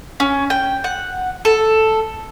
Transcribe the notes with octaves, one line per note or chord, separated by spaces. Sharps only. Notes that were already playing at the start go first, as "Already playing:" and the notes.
C#4
G5
F#5
A4